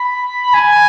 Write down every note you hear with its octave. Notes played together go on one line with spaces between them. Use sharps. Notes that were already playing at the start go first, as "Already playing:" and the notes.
Already playing: B5
G#5